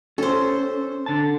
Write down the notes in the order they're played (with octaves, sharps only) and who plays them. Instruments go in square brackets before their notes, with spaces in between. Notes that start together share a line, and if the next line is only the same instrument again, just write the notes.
[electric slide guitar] C#4 [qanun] A4 C5
[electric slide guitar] D3 A5